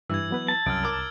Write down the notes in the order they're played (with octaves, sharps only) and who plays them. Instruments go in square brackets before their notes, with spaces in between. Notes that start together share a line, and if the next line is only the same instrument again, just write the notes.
[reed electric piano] G2 [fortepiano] E3 [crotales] E6 G#6
[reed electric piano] F#3 B3 B4
[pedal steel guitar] A5
[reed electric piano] C2 [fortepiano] F#2 [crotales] F6 A6 D7
[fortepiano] A#4 D6